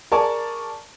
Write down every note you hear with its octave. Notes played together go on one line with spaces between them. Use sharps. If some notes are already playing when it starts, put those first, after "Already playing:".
G#4 A#4 D5 G#5 A5 C#6